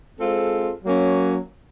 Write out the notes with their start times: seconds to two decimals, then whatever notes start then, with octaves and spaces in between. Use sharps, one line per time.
0.19 G#3 C4 F4 A4
0.84 F#3 A#3 C#4